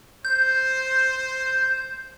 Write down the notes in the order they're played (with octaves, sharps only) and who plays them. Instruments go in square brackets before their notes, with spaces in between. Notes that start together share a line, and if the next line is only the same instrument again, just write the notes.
[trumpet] C5 [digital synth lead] G6